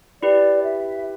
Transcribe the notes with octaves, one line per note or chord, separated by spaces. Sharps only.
E4 G4 B4 D5
E5